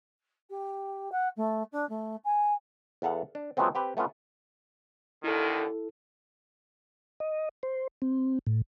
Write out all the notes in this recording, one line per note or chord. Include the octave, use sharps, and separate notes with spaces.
G4
F#5
A3
D4
A3
G#5
E2 B3 A4 F5 F#5
D4
F3 F#3 G#3 A3 B3 C4
C4 G4 B4
A3 B3 C#4 F4
D#2 D3 D#3 E4 A4
D#5
C5
C4
A2